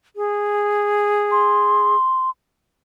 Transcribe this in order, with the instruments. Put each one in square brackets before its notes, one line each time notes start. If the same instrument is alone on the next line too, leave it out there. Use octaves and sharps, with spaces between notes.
[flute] G#4
[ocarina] C6